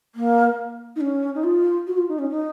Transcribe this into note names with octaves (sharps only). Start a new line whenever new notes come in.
A#3
D#4
C#4
D#4
F4
F#4
F4
D#4
C#4
D#4